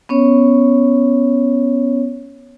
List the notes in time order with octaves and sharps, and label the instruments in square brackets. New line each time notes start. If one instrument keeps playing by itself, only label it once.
[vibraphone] B3 C#4 C#5